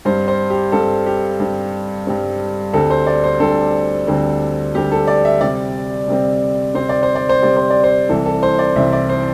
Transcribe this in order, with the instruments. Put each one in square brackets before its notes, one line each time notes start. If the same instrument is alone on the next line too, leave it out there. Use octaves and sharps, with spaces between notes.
[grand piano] G2 G3 C4 C5
C5
G4
G2 G3 C4 A4
G4
G2 G3 C4
G2 G3 C4
D2 D3 G3 C4 A4
C5
D5
C5
D2 D3 G3 C4 A4
D2 D3 G3 C4
D2 D3 G3 C4 G4
A4
D5
E5
C3 G3 C4 D5
C3 G3 C4
C3 G3 C4 C5
D5
C5
D5
C5
C3 G3 C4 D5
C5
D5
C5
C2 C3 E3 A4
A4
C5
D5
C2 C3 E3 E5
D5
C5